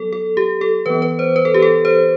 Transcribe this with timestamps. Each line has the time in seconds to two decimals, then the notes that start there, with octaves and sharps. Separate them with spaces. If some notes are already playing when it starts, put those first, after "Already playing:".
Already playing: F#3 B3 A4
0.13 A4
0.37 G4
0.61 A4
0.86 E3 B3 B4
1.02 B4
1.19 C5
1.36 B4
1.45 A4
1.54 G4
1.62 A4
1.85 C5